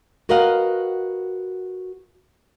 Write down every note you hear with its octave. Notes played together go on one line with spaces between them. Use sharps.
F#4 A#4 B4 D#5 F5 F#5